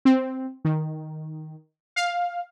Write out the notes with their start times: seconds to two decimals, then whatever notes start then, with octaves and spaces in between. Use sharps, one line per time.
0.05 C4
0.65 D#3
1.96 F5